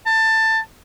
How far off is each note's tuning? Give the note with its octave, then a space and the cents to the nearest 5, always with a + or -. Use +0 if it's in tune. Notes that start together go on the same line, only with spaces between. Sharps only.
A5 +15